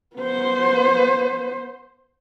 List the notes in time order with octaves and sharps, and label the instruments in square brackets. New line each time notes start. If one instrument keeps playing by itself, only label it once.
[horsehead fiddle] B3 C5